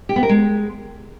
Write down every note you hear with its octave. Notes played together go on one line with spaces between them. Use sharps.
G4
B3
A#4
G#3